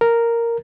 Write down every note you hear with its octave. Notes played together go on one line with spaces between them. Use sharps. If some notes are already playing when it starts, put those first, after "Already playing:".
A#4